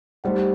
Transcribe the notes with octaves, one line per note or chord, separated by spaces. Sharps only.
G3 A3 D#4 G4 C5 F#5